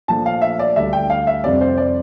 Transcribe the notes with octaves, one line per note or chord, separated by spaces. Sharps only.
A#2 F3 A3 D4 A5
F5
E5
D5
D2 D3 G3 D4 E5
G5
F5
E5
F2 C3 G3 C4 D5
C5
D5